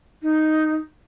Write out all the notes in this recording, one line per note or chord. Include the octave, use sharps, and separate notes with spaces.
D#4